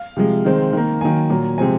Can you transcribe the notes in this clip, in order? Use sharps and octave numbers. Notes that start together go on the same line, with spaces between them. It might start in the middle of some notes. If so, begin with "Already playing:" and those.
Already playing: F5
C3 F3 G#3
D#3 G#3 C4
D#3 A#3
D#3 F#3 A#3 G#5
A#2 F#3 A#3
C3 F3 G#3 C4 G#5